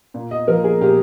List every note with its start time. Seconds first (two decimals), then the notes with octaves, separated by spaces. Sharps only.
0.14 A#2
0.31 D#5
0.48 F3 A#3 A#4
0.64 G#4
0.81 A#2 G4